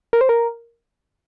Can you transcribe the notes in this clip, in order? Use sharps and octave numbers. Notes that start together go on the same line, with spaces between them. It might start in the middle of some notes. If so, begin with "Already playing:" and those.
A#4
C5
A#4